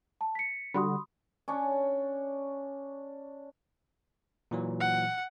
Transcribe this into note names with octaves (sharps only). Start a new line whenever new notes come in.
A5
B6 C#7
D3 G3 F#4 B5 C6 D#6
C#4 D4 C#5
A#2 E3 F#3
F#5